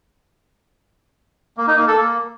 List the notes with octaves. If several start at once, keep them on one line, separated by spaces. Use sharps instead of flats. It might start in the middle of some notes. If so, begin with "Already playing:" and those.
A#3
D#4
A#3
A4
A#3